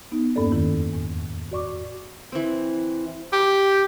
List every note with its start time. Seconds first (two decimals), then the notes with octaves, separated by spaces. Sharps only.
0.12 B3 D#4
0.36 E2 G2 A#3 C#4 A4 D5
0.52 F2 D#3 E4
0.93 E2 A2
1.51 F#4 D5 C#6 D6
2.32 E3 C4
3.32 G4